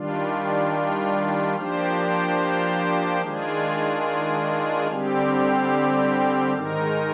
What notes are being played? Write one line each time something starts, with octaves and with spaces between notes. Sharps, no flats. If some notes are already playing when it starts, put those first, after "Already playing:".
Already playing: D#3 G3 D4 F4
F3 A#3 D4 G4 C5
D#3 G#3 D4 F4 G#4
D3 G3 C4 G4
G#2 D#3 G#3 D#4 A#4